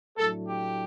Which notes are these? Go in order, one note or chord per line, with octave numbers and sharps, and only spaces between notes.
A2 F#3 A3 D4 A4
G4